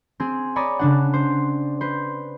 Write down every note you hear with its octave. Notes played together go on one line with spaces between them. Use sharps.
C4 G#4
C#5 D5 A#5 B5 D#6
C#3 D4 F#5
C5
B4 C5